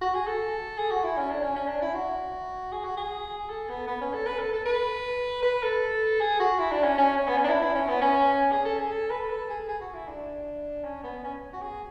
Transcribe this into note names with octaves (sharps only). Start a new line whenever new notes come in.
F#4
G#4
A4
G#4
F#4
E4
C#4
D4
C#4
C#4
D4
E4
F#4
G#4
F#4
G#4
A4
B3
B3
C#4
A4
B4
A4
A4
B4
B4
A4
G#4
F#4
E4
D4
C#4
C#4
C#4
B3
C#4
D4
E4
E4
C#4
B3
C#4
G#4
A4
G#4
A4
B4
A4
G#4
G#4
F#4
E4
D4
C#4
B3
C#4
F#4
G#4